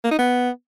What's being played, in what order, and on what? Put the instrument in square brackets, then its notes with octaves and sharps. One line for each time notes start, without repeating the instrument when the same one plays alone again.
[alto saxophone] A#3
D#4
B3